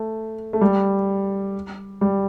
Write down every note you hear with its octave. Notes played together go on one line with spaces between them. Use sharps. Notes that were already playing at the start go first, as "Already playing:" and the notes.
Already playing: A3
A3
G3
G3